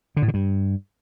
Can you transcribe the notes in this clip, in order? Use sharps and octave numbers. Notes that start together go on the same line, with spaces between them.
D3
A2
D3
G2